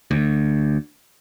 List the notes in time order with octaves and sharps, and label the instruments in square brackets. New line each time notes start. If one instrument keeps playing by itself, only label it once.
[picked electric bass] D2